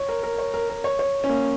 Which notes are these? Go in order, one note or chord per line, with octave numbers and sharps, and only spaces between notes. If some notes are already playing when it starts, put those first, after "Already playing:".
Already playing: C#5
A#4
A#4
C#5
A#4
A#4
C#5
C#5
C#4
A#3